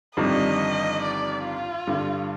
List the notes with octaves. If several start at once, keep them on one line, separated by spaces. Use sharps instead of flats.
G1 F2 D#3 G3 D4 D#5
D5
F4
G2 D3 G3